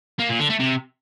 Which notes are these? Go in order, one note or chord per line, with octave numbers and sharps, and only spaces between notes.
A#3
A#2
D3
A3
C3